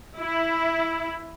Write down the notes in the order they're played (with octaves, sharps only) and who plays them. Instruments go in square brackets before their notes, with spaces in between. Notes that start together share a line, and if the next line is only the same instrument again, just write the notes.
[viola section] E4